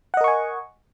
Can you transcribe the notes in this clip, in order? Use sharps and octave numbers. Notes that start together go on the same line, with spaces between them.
A#4 D#5 F#5 G#5 C#6